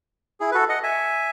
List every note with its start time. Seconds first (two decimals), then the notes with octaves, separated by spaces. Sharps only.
0.40 E4 G#4
0.51 B4
0.54 F#4 A4
0.69 D#5 F#5
0.83 E5 G#5